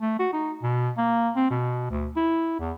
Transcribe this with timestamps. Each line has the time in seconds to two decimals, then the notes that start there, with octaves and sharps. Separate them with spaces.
0.01 A3
0.19 F#4
0.33 D#4
0.63 B2
0.98 A#3
1.36 C4
1.50 B2
1.90 D2
2.16 E4
2.60 E2